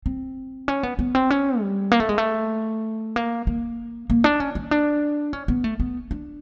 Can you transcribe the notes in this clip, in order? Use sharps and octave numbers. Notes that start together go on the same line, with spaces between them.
C4
C#4
B3
B3
C4
C#4
G3
A#3
A3
G#3
A3
A#3
A#3
A#3
D4
C#4
C#4
D4
C#4
B3
A3
B3
D4